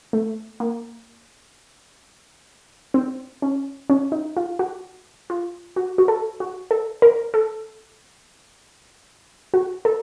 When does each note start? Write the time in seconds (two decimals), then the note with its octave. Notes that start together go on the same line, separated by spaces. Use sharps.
0.13 A3
0.60 A#3
2.94 C4
3.42 C#4
3.90 C#4
4.12 D#4
4.37 F4
4.59 F#4
5.30 F4
5.76 F#4
5.98 F#4
6.08 A4
6.40 F#4
6.71 A4
7.02 A#4
7.34 A4
9.54 F#4
9.85 A4